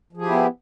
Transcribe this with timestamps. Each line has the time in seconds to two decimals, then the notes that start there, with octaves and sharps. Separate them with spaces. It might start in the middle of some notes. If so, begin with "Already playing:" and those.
0.13 F3
0.17 G#4
0.21 G4
0.26 E4
0.30 B3